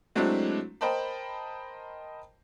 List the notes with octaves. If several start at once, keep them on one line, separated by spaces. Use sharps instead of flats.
F#3 G#3 A3 C4 D4 E4
A#4 C5 D#5 G5 A5 B5